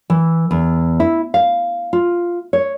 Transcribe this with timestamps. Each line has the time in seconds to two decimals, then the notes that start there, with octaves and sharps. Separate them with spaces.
0.10 E3
0.51 E2
1.00 E4
1.34 F5
1.93 F4
2.53 C#5